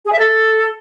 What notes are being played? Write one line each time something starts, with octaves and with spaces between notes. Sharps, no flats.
G#4
E5
A4